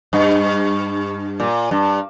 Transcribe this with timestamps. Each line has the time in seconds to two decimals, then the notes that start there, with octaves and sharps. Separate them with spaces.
0.13 G2
1.40 A#2
1.71 G2